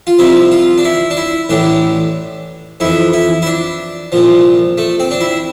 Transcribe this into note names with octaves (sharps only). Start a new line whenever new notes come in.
F4
C2 C3 F3 E4
F4
D4
E4
D4
E4
A1 A2 E3 D4
F2 E3 E4
E4
E4
D4
C2 A#2 F3
A3
C4
D4
E4